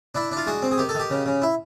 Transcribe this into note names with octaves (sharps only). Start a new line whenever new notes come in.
D4 E4
D4
F4
G#3 F#4
C4
G#4
D#3 G4
A4
D#3 G4
C#3
C#3
E4